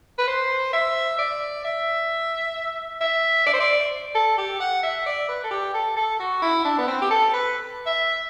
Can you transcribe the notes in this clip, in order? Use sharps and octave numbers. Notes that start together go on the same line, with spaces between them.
B4
C5
E5
D5
E5
E5
D5
C5
D5
A4
G4
F#5
E5
D5
B4
A4
G4
A4
A4
F#4
E4
D4
B3
C4
G4
A4
B4
E5